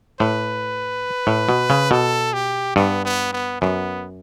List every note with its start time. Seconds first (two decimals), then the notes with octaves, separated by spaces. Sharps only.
0.20 A2 B4
1.27 A2
1.49 B2
1.70 C#3
1.91 B2 A4
2.33 G4
2.76 G2 B3
3.05 B3
3.33 B3
3.61 F#2 B3